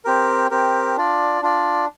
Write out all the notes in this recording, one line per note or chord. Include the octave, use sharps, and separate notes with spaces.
C4 G4 A#4
C4 G4 A#4
D4 F4 D5
D4 F4 D5